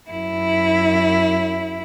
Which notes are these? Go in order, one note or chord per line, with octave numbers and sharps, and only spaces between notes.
F#2 E4